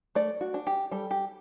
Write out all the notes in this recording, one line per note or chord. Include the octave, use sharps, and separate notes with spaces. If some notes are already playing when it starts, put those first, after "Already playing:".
A3 D5
F#4
D4
G4
G3 A4
G4